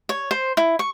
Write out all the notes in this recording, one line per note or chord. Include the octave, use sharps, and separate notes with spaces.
C#5
C5
E4
C#6